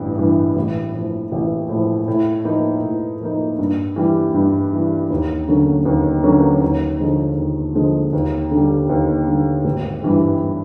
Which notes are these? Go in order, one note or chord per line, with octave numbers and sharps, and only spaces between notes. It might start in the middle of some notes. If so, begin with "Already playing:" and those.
Already playing: A1 G2
G2 E3
A1
A2 F3
A1
A2 F3
A2
F3 A#3 D#4
A2
F3 A#3 D#4
G2
E3 G3
G2
E3 G3
D#2
D3 F#3 A#3 C#4
D#2
D3 F#3 A#3 C#4
D#2
D3 F3 G#3
D#2
D3 F3 G#3
D#2
D3
G3
D#2
D3 G3
G#1
G2 E3 G3